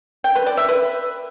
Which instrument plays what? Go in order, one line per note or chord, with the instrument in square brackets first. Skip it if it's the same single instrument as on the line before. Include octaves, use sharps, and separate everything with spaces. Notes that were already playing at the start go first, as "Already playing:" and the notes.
[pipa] G5
B4
D5
E5
B4